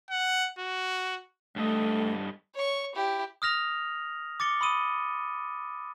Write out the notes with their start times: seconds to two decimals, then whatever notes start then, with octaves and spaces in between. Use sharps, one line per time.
0.11 F#5
0.59 F#4
1.56 G2 A3 A4 D#5
2.54 C#5 C#6
2.95 E4 G4
3.42 D#6 F6 A#6 F7
4.40 D6 A6 C#7 G7
4.61 B5 C6 D#6 D#7